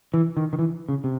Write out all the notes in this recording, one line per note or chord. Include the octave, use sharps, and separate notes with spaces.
E3
D#3
D#3
E3
C#3
C3